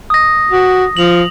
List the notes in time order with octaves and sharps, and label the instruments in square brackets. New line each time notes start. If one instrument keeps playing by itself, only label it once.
[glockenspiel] D#6 A#6
[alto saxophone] F#4
[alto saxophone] F3 [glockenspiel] F7 F#7